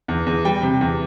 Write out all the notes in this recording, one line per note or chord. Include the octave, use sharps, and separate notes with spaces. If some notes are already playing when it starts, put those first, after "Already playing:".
E2
E2
G3 G5
C3
E2